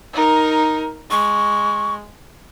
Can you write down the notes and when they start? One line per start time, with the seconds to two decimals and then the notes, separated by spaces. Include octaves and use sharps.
0.13 D#4 A#4
1.11 G#3 C#6